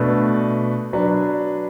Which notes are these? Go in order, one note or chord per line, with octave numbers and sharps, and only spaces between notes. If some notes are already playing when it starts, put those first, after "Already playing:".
Already playing: B2 A3 D4 B4
F#3 D4 B4